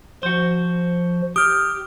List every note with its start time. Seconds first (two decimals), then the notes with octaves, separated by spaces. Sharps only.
0.23 F3 F#4 C5
1.36 G4 D#6 F6